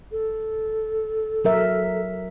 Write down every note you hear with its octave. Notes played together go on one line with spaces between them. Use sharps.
A4
F#3 A#4 E5